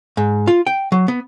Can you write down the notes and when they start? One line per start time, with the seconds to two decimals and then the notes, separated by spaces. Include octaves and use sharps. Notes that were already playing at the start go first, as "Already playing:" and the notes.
0.17 G#2
0.47 F4
0.67 G5
0.92 F#3
1.08 B3